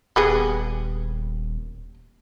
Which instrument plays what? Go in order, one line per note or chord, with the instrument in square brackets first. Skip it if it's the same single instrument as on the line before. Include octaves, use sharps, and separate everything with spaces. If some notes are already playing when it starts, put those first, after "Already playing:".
[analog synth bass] D#1 [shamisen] G3 B3 G#4